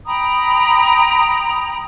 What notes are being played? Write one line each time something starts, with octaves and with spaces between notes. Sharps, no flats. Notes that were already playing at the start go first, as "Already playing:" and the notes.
G5 A#5 B5 D#6